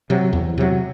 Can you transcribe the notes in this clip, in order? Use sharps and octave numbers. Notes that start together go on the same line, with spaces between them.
C3 F#3
E2
C3 F#3